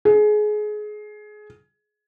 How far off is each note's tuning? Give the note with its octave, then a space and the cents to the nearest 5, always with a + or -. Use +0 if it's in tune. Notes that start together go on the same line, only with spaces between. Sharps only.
G#4 +25